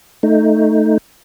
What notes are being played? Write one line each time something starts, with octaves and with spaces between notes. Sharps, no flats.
A3 D#4